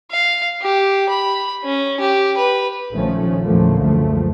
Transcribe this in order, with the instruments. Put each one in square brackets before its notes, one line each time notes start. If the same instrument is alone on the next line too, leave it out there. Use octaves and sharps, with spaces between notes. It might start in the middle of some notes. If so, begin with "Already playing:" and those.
[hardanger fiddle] F5
G4
B5
C#4
G4
B4
[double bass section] A#1 D#3 F3 A3 C#4
E2 A#2 D3 F3 A3 A#3
C#2 F#2 F3 A3